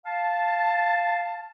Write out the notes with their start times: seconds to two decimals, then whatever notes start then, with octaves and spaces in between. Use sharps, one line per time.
0.06 F5 A5